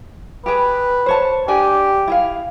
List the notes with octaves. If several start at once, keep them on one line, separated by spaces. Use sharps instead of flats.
G4 G#4 B4
C5 C#5 A5
D4 G4 G#4 G#5
E4 G#4 F5